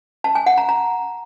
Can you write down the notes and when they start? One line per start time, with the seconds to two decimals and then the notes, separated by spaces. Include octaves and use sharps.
0.24 A5
0.35 G#5
0.46 F#5
0.58 A#5
0.69 A#5